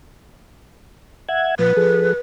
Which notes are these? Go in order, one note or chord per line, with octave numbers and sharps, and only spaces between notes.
E5 F#5 G#6
A#2 F3 B4
F3 G#4 A4